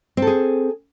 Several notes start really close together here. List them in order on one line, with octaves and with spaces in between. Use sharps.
C4 A4 G#4